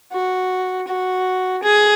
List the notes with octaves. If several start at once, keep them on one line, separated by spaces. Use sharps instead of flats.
F#4
F#4
G#4